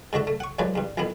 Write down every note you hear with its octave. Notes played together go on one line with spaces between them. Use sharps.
G#2 D3 F#4 E5
A3
F#5 C#6
D#2 F3 F#3 G#3 B4 D5
E2 G2
A#1 F2 D#3 B3 E4